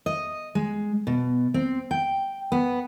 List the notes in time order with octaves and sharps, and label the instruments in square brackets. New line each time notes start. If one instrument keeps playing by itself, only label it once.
[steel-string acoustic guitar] D#5
G#3
B2
C4
G5
B3